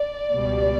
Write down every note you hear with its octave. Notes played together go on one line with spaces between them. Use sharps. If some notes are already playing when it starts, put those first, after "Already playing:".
Already playing: D5
C#2 B2 G3